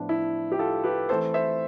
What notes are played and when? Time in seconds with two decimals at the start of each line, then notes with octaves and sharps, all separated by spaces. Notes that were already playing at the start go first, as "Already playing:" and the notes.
Already playing: A2 F3 B3 D4
0.09 E4
0.52 G4
0.59 F4 A4
0.84 G4 B4
1.09 E3 A3 C4 A4 C5
1.34 C5 E5